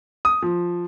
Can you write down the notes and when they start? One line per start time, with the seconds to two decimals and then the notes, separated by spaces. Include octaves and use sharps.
0.25 D#6
0.42 F3